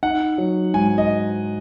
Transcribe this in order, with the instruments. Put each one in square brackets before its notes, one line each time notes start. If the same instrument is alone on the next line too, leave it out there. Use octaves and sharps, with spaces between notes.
[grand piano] D#4 F#5
F#3
G#2 G#5
D#5